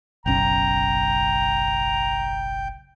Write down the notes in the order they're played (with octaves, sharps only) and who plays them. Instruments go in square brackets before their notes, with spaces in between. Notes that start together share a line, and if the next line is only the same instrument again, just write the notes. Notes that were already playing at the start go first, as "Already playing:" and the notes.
[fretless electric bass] F#1 B1 C#4 [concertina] G5 [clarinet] A#5